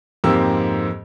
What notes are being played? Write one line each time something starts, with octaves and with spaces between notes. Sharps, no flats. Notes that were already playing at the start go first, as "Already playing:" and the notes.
F2 G#2 A#3 C4 G4 E6